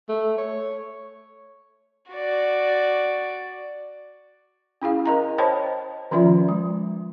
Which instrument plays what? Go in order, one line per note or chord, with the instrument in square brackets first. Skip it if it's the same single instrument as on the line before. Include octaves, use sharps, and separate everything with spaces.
[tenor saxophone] A3
C#5
[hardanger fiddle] F#4 D5
[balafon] C#4 E4 G#4 F5
A#4 D#5 A#5
C5 C#5 D#5 G5 A5 B5
D#3 F3 C#4 F4 D5 E5
G#3